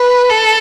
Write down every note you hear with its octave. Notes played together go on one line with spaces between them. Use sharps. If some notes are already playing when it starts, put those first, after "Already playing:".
Already playing: B4
A4